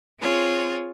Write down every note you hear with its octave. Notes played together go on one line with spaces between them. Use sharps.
C4 F4 G#4 C#5